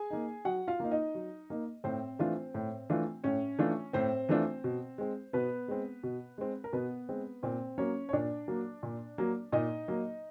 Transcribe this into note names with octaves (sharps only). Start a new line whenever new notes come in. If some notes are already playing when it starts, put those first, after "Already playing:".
Already playing: G#4 G#5
A#3 D#4
F#3 F#4 F#5
F4 F5
A#3 D#4
D#4 D#5
F#3
A#3 D#4
A2 C4 C5
E3 A3 D4 F4
A2
E3 A3 D4 F4
A2 C#4 C#5
E3 A3 D4 F4
A2 C4 C5
E3 A3 D4 F4
B2
G#3 C4
B2 B3 B4
G#3 C4
B2
G#3 C4
A#4
B2 B3 B4
G#3 C4
A#2 C4 C5
F#3 A#3 C#4 C#5
C#5
A#2 D4 D5
F#3 A#3
A#2
F#3 A#3
A#2 D#4 D#5
F#3 A#3